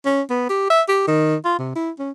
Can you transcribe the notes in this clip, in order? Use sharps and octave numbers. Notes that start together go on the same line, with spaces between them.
C#4
B3
G4
E5
G4
D#3
F4
C3
E4
C#4